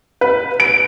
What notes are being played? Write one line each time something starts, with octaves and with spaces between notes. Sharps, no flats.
B4
D7